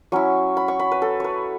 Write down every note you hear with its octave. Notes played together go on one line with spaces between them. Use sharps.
F#3 C#4 E4 C#6
B5
C#6
B5
B4
A4
B4 C#5